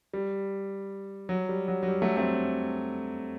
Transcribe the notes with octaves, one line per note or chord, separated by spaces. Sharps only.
G3
F#3
G3
F#3
F#3
G3
F#3 A3
A3 C4